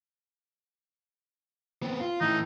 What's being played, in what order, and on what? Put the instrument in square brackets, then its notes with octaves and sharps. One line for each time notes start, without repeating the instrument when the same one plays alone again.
[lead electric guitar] B3 C4
F4
[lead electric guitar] A2 E3 [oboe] D#4